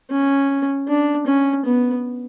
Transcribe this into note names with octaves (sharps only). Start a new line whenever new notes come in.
C#4
D4
C#4
B3